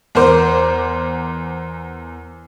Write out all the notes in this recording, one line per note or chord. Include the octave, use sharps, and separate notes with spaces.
E2 A#4 C5 D6